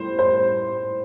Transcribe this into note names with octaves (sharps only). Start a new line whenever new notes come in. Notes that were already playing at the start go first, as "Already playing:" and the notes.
Already playing: A2 G3 C5
C5